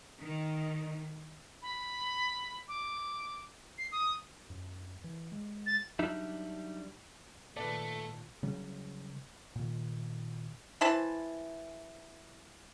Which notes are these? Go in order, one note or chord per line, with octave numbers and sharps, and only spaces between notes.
D#3
B5
D6
C7
D#6
F#2
E3
G#3
A6
F#3 G3 D4 D#4 E5
A#2 D#3 A3 B4 D5 A5
C#3 F#3 G3
A#2 D#3
E3 E4 C5 A5